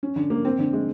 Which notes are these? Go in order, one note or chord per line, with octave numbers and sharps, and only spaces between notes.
C#4
D3
A#3
C4
D3
G#3